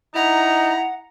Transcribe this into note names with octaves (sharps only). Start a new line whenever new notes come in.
D#4 E4 F#5 A#5